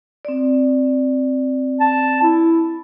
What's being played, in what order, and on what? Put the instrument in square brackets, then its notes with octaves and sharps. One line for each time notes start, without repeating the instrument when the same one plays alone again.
[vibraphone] C4 D5
[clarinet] A5
E4